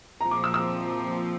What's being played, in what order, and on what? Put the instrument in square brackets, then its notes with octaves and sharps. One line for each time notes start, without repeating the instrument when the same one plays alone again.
[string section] A#2 F3 C4 [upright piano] A#5
[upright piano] D6
E6
E6